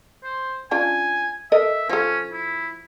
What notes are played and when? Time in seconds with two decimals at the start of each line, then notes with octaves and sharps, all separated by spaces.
0.24 C5
0.71 C#4 D4 F4 G#5
1.52 A4 A#4 D#5 E5
1.89 F3 C#4 A4
2.32 E4